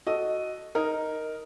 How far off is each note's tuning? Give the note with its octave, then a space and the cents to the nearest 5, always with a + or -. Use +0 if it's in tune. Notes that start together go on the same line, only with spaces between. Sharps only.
F#4 +0 A4 +0 D#5 +0
D#4 +0 A#4 +0